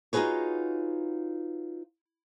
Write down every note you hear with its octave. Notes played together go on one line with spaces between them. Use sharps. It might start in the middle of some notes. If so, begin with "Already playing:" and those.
D#4 F4 F#4 G#4 B4 C#5